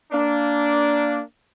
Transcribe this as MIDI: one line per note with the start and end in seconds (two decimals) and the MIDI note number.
0.11 1.20 58
0.11 1.20 62